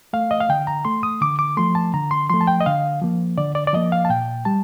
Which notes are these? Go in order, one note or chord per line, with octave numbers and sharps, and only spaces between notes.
A3 F5
D#5
F5
D3 G5
A#5
A3 C6
D#6
D3 D6
D6
F3 A3 C6
A5
D3 A#5
C6
F3 A3 C6
A5
G5
D#5
D3 F5
F3 A#3
D3 D5
D5
D5
F3 A#3 D#5
F5
A5
A#2 G5
G3 A5